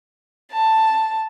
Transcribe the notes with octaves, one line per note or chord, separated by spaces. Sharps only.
A5